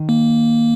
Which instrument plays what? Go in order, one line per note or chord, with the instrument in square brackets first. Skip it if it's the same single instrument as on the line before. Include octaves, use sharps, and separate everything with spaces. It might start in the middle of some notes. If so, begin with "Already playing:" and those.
Already playing: [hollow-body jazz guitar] D#3
[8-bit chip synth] A#3